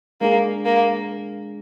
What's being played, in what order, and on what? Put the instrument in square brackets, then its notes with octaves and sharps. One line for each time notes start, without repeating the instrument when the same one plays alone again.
[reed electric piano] G#3 D4 G#4 [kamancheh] A#3
[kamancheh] A#3